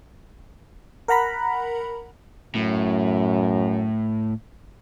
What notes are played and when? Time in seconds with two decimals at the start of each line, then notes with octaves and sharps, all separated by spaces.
1.08 A#4 F#5 A#5 B5
2.55 F#2 A2